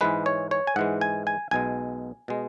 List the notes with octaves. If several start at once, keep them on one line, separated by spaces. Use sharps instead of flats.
G#2 E3 G#3 B4
C#5
C#5
G#5
G#2 E3 G#3 F#5
G#5
G#5
B1 B2 G#3 G#5
B2 G#3